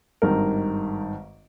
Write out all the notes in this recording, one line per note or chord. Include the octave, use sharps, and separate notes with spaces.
G#1 G2 D#3 A#4